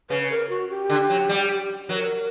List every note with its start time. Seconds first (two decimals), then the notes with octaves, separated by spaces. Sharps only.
0.10 C#3 B4
0.21 B4
0.31 A#4
0.49 F#4
0.69 G4
0.90 D3
1.10 F#3
1.29 G3
1.89 F#3 B4
1.94 A#4